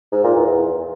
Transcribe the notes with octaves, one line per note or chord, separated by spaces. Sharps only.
G#2
A#2
E2
E2